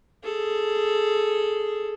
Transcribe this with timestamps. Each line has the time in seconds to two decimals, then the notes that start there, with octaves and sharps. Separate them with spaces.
0.24 G#4 A4